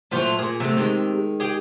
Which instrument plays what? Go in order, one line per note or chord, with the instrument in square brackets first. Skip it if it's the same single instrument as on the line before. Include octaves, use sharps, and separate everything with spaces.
[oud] A#2 F3 F#3 [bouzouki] A3 F4 C5
[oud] A#2 [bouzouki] G#4
[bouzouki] C3 [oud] F#3 A3
[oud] D#3 G#3
[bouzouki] G4 G#4